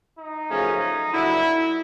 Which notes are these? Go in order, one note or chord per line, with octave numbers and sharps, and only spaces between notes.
D#4
F#2 C#3 F3 A3 C#4
G2 D3 F#3 E4